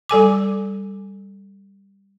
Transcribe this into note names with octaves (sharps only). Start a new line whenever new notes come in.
G3 A4 G#5 D6